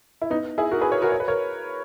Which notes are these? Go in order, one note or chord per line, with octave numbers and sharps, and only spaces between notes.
E4
B3 D#4
E4 G#4
F#4 A#4
G#4 B4
A#4 C#5
F#4 A#4
C#5
B4
A#4 C#5